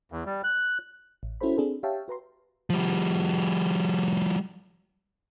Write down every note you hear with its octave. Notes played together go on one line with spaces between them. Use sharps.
E2
G3
F#6
A1
C#4 E4 F#4 A4 C5 B5
C4 D4 G#4 A4
G4 C#5 E5 F5 G5 A5
F#4 B4 A#5 C6
F3 G3